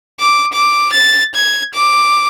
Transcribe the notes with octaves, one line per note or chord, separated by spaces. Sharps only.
D6
D6
A6
G#6
D6